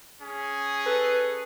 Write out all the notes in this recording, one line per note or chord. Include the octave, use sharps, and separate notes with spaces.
C#4 G#4
A4 B4